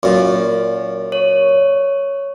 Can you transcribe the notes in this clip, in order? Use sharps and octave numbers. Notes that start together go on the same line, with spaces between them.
F#2 A#2
C#5